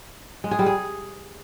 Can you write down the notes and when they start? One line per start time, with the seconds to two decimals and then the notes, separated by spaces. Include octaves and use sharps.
0.44 G#3
0.51 G#4
0.59 G3
0.66 G#4